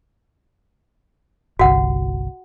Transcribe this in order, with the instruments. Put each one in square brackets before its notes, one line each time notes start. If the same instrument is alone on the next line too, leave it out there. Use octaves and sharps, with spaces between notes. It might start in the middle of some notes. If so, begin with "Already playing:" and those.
[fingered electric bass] G1 C2 [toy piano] F#4 F#5